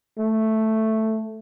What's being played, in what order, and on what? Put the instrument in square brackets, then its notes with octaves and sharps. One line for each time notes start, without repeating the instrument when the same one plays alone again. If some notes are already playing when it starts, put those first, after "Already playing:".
[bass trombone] A3